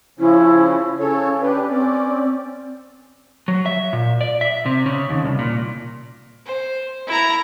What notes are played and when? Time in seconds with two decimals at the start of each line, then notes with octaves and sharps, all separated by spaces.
0.20 C#3 F3 C#4 E4
0.99 C#3 C#4 A4 C#5
1.42 D4 G4 B4
1.69 C4 C#4 D5
3.48 F#3
3.66 E5
3.93 A#2
4.21 D5
4.41 E5
4.66 C3
4.86 C#3
5.10 D#2
5.24 C2
5.39 A#2
6.46 C5
7.07 E4 A#5